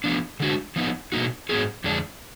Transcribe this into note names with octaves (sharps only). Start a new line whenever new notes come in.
F3 B3 D4
D3 G#3 D4 F#4
F3 B3 D#4
B2 A#3 D#4 F#4
G#2 F#3 B3 F4 G#4
F2 D3 G#3 D4